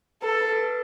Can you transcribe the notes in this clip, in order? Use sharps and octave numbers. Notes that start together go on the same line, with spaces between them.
A4 B4
B4
A4
B4